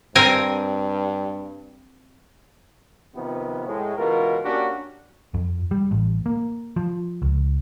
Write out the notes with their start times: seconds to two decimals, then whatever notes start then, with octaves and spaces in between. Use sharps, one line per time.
0.15 G2 C4 A#4 G#5
3.15 C3 D#3 F3 B3
3.67 A2 G#3
3.98 C#2 B2 E3 F4 A#4
4.44 A#3 C#4 D4 F#4 G4 A#4
5.34 F2
5.71 G3
5.91 A1
6.26 A#3
6.76 F3
7.22 C#2